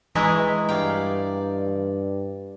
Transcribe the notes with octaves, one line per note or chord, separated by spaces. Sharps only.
E3 G#3 E4 A#5 C#6 D#6
G2 D5 F5 G5 A#5